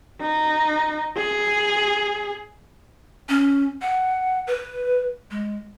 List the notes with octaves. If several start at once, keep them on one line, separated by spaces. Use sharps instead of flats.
D#4
G#4
C#4
F#5
B4
G#3